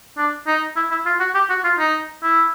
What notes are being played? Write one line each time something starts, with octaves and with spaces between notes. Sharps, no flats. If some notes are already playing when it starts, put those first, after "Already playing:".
D4
D#4
E4
E4
F4
F#4
G4
F#4
F4
D#4
E4